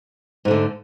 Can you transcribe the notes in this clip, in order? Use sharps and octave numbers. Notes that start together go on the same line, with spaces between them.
G#2 D3 A3